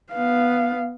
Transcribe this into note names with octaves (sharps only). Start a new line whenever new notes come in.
B3 F5